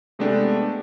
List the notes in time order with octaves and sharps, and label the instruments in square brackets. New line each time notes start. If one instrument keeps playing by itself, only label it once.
[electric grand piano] C3 G#3 A3 B3 D4 G4